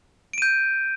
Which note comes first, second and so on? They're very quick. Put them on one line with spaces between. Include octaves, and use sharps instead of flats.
D7 D#7 G6